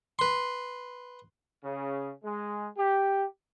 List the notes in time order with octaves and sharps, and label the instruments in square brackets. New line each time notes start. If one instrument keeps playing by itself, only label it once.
[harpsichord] B4 C6
[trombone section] C#3
G#3
G4